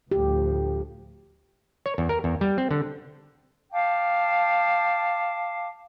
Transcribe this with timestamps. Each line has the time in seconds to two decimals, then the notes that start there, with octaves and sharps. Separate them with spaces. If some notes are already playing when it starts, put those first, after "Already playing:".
0.12 D2 A2 F3 G4
1.86 C#5
1.98 E2
2.09 A#4
2.24 E2
2.41 G3
2.58 C4
2.71 D3
3.71 F5 G5 A5 D6